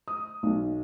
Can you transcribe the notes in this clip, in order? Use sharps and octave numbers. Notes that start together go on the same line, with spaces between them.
D#6
B1